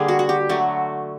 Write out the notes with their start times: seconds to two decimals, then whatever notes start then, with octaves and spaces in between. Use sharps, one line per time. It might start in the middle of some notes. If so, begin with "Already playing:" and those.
Already playing: D3 G3 A#3 G#4
0.08 F#4
0.19 F#4
0.29 G4
0.49 D3 F#3 A3 F#4